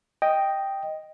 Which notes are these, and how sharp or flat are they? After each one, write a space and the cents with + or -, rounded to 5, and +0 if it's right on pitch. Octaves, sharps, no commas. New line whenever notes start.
D#5 +0 G5 +0